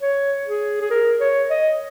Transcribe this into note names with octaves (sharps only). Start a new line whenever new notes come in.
C#5
G#4
G#4
A#4
C#5
D#5